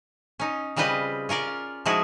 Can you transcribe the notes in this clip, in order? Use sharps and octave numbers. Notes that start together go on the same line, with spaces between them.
C#4 D#4
C#3 G3 C4 F4 B4 D#5
C#4 F4 A#4 D5
F3 G#3 D#4 E4 F#4 G#4